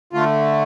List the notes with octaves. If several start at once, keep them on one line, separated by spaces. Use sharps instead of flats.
D3 A3 F4